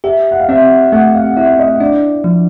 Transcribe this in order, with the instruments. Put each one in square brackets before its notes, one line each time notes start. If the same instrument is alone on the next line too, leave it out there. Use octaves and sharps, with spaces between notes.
[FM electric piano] G4 [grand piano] E5
[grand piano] F#5
F5
[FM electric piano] C4 [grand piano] E5
[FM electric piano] A3 [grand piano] F#5
[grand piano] F5
[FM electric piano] E4 [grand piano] E5
[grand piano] D#5
[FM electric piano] D4 [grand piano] D5
[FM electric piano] F3